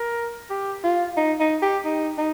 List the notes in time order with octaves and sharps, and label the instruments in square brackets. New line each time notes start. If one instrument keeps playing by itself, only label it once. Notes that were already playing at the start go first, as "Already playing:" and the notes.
Already playing: [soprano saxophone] A#4
G4
F4
D#4
D#4
G4
D#4
D#4